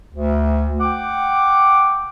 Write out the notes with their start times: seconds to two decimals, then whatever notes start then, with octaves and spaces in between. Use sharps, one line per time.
0.14 D2
0.80 F#5 G5 D6